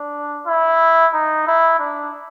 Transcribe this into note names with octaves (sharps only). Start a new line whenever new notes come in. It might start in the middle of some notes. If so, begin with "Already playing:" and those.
Already playing: D4
E4
D#4
E4
D4